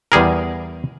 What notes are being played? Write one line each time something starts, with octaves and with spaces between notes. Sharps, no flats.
E2 G3 G#4 A#4